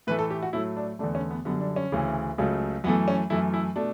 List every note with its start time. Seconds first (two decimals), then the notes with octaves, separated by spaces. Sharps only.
0.07 A2 E3 A3 B4
0.19 A4
0.31 G4
0.42 F#4
0.53 A2 F#3 A3 E4
0.77 D4
0.99 E2 D3 A3 D4
1.15 C#4
1.31 B3
1.45 F#2 D3 G3 B3
1.60 D4
1.76 C#4
1.92 D2 C#3 E3
2.38 C#2 C#3 F#3 A3
2.84 F#2 E3 A3 B3
3.08 C#4
3.30 F#2 E3 A3 E4
3.54 E4
3.76 B2 A3 D4